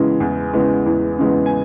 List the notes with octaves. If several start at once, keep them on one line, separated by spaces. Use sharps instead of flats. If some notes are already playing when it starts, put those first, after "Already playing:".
Already playing: C#3 E3 G#3 B3
E2
C#3 E3 G#3 B3
E2
C#3 E3 G#3 B3
G#5